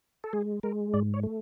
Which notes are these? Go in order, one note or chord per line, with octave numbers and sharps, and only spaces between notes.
A4
G#3 G#4
G#3 A#4
G#2 D5
C#5
A3